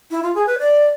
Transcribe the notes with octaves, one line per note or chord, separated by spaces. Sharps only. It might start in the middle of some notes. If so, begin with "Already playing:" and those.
E4
F4
G#4
B4
D5